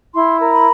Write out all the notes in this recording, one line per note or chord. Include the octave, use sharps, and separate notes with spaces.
E4 C6
A#4
B5